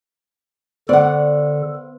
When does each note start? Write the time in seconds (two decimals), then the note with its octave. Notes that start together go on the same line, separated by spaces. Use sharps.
0.89 D3 B3 A4 B4 C5 D5 F#5